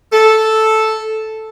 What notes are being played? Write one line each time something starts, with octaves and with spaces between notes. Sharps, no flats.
A4